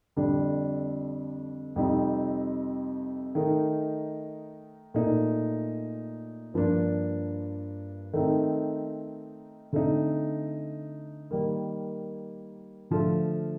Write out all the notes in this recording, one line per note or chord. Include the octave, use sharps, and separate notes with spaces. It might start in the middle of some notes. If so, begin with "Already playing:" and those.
F2 D3 G3 D4
F2 C3 G3 C4 D#4
D#3 A3 D#4
A#2 A3 D#4
G2 F3 A#3 D4
D#3 A3 C4 D#4
D3 A3 C4 D#4
D#3 G3 A#3
D3 F3 A3